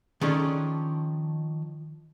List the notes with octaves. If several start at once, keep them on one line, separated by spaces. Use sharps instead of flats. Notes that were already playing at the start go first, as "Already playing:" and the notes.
D#3 F3 C#4 D4 G#4 A4